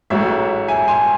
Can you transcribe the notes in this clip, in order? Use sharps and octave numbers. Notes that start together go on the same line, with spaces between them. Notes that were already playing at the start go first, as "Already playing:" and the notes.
A1 G#2 F#3 A3 C#5 E5
E5 G#5
G#5 C6